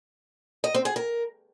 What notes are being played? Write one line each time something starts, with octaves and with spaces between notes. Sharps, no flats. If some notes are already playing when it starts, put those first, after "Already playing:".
D#5
C4
G#4
A#4